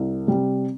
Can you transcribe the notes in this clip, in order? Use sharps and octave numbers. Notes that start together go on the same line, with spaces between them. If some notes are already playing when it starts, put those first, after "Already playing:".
Already playing: C2
C3 G3